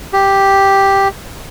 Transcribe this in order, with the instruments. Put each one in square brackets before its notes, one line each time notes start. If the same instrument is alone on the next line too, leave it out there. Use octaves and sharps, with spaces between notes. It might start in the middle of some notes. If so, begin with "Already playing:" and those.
[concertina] G4